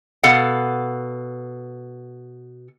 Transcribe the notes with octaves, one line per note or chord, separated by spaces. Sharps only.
B2 A4 F5 F#5